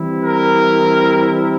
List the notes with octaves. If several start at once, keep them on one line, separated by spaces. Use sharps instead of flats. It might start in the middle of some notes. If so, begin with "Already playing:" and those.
Already playing: E3 G3 C4 E4
A#4